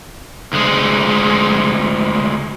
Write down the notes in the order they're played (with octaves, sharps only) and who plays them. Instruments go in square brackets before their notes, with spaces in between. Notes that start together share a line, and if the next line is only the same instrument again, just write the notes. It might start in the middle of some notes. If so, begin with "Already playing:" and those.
[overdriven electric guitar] D2 G#3